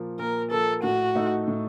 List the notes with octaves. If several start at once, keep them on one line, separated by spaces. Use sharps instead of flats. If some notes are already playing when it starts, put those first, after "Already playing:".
Already playing: A#2 F3 A#3
A#2 A#4
F3 A#3 A4
A2 F#4
A3 D#4 A4
A2